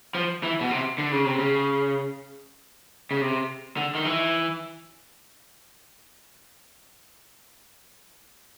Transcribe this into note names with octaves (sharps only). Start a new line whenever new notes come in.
F3
E3
B2
C3
D3
C#3
C3
C#3
C#3
C3
D3
D#3
E3